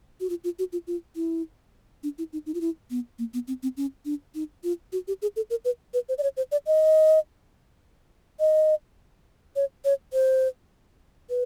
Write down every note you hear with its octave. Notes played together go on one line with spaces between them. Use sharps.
F#4
F4
F4
F#4
F4
F4
E4
D4
E4
D#4
D#4
F4
E4
B3
A#3
B3
C4
C4
C#4
D4
D#4
F4
F#4
G4
G#4
A4
A#4
B4
B4
C5
D5
C#5
C5
D5
D#5
D#5
C#5
C#5
C5
B4